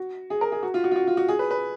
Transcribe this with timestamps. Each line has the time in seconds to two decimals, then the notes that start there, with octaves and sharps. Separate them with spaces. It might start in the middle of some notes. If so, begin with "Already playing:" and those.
Already playing: F#4
0.30 G#4
0.41 A#4
0.52 G#4
0.63 F#4
0.74 F4
0.84 F#4
0.91 F4
0.96 F#4
1.07 F4
1.17 F#4
1.29 G#4
1.39 B4
1.51 B4